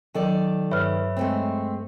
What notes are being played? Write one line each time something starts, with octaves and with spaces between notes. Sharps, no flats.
D#3 F#3 A4 D5
G2 B4 C#5 E5 B5 F6
G#3 A3 C4